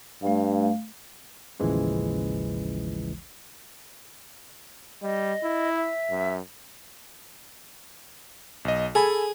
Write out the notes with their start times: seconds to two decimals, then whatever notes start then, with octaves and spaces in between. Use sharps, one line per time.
0.23 G2 A3 F5
1.60 A1 D#2 C#3 E3 F3 G#3
5.02 G3 D#5
5.43 E4
5.75 E5
6.10 F#2
8.65 B1 D#5
8.95 G#4 A4 G#5 B5